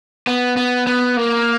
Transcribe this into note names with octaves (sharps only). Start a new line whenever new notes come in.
B3
B3
B3
A#3